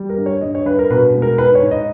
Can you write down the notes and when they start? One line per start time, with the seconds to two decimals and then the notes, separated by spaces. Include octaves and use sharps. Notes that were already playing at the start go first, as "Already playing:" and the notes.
Already playing: G3
0.09 A#4
0.18 G2
0.26 C#5
0.41 G2 D#5
0.55 C#5
0.66 G2 B4
0.79 A#4
0.90 B2 B4
1.15 G#3
1.22 A#4
1.38 G#2 B4
1.55 C#5
1.63 G#2
1.71 D#5